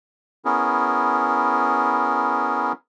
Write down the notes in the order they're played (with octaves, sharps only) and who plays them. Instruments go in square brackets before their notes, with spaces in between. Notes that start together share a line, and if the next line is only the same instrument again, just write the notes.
[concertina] B3 C#4 E4 G#4 A#4